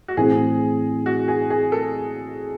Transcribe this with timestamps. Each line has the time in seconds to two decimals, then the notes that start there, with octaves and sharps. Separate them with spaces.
0.08 F#4
0.17 A2 E3 C4 G#4
1.06 F#4
1.28 G#4
1.50 G#4
1.72 A4